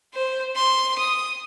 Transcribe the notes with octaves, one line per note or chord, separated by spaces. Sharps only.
C5
C6
D#6